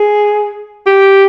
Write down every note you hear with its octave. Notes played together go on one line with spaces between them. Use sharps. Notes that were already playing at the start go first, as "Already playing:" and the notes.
Already playing: G#4
G4